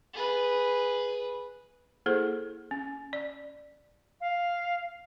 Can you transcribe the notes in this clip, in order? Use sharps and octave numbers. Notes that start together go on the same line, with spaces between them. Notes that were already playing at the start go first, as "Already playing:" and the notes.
G#4 B4
A#3 E4 G#4 A4 C5
C#4
D5
F5